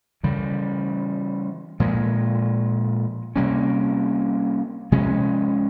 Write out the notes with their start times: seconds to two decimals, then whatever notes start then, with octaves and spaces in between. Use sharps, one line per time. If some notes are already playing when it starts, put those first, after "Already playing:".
0.23 C#3 E3 G3
1.80 A#2 F3 G#3
3.36 C3 G3 A#3 C#4
4.92 C3 F3 G#3 C#4